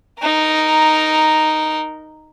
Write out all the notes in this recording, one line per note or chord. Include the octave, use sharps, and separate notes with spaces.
D#4 A#4